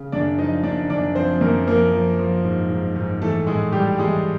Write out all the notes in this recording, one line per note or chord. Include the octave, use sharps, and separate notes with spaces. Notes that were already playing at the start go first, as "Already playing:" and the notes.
Already playing: C#3
F#2 D4 D5
F3 D#4 D#5
F#2 D4 D5
F#2 D4 D5
F3 C4 C5
F#2 A#3 A#4
F3 A#3 A#4
F3
F3
G#2
G#2
G#2
E3 A3 A4
A2 G#3 G#4
A2 G3 G4
E3 G#3 G#4